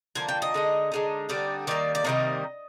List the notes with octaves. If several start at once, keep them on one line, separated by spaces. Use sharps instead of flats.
D3 F3 A#3 G#5
G5
D#5
D3 G#3 D#4
D3 G#3 D#4
D3 G3 C4 D#4 D5
D#3 G3 A#3 D5
D5
C3 D#3 G3 A#3 D#5